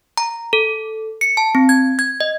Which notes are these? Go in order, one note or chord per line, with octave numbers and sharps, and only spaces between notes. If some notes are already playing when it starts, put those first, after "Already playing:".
A#5
A4
C#7
A5
C4
G#6
G#6
D#5